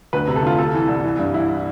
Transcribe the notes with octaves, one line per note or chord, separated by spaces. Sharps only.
D2 B4
C3
A4
D2 F4
C3 A4
E3
C2
E3
G2
E3 E4